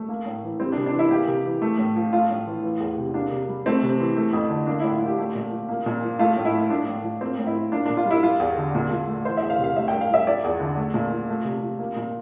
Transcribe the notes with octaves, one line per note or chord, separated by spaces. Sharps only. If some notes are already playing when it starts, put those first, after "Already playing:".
Already playing: A3
A#3
A2
E3
G3 C4
D4
C3
D4
E3
E4
A#3 G4
C3
E3
A3
A2
F3
A3 F4
A2
E3
E3
E2
C3
A#3 D4
C3
G3
A3 C4
C3
E3
A3
F2
D3
A#3 D4
A2 E4
F4
F3
G4
A3
A#2
F3
A#3
A#2
F3
A3 F4
A2
E4
F3
A3 D4
A2
F3
A#3 C4
A2
E4
F3
A#3 D4
D4
A#2
F4
G3
E4
F3 F4
E2
D3
A#2
A#2
A3
E3 C5
E5
E2
F5
C3
F5
A3 E5
G5
G2
F5
F3 E5
F3 D5
E2
D3
A3
A#2
F3
A3
C3
F3
A#3
A#2